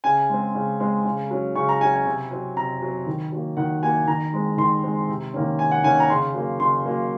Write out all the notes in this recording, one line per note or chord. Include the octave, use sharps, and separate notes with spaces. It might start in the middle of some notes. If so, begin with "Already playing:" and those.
C#3 G#5
G#3 C4
C#3
G#3 C4
C#3
F#3 C#4
C#3 C#6
A#5
F#3 C#4 G#5
G#5
C3
F#3 C4
C3 A#5
F#3 C4
D#3
F#3 A#3
D#3 F#5
F#3 A#3 G#5
D#3 A#5
G#3 C4
D#3 C6
G#3 C4
C3
D#3 A#3 C#4
C3 G#5
F#5
D#3 A#3 C#4 G#5
A#5
C#3 C6
F#3 A#3
C#3 C6
F#3 A#3